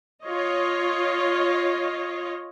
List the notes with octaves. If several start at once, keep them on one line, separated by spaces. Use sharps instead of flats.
F4 C#5 D#5